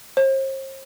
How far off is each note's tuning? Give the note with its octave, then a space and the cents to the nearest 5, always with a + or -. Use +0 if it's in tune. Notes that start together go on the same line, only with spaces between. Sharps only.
C5 +40